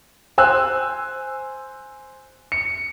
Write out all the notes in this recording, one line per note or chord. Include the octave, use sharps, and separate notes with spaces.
C5 G#5 E6 F#6
C#7